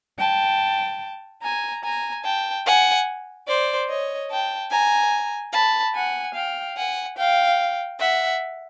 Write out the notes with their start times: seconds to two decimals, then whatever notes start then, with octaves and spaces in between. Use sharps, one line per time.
0.18 G5 A5
1.42 G#5 A#5
1.83 G#5 A#5
2.24 G5 A5
2.65 F#5 G#5
3.47 C5 D5
3.88 C#5 D#5
4.29 G5 A5
4.70 G#5 A#5
5.52 A5 B5
5.93 F#5 G#5
6.34 F5 G5
6.76 F#5 G#5
7.16 F5 G5
7.98 E5 F#5